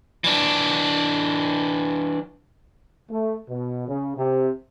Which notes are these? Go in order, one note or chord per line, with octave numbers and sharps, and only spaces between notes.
E3 D4
A3
B2
C#3
C3